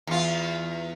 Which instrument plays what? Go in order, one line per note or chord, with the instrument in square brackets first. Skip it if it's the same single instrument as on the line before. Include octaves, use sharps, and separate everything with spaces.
[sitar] E2 F4